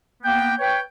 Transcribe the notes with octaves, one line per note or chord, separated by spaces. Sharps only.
A#3 B3 G5
B4 C#5 G5